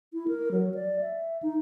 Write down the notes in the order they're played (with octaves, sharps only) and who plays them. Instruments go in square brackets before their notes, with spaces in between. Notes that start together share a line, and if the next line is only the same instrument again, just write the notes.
[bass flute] E4
A#4
F#3
D5
E5
D#4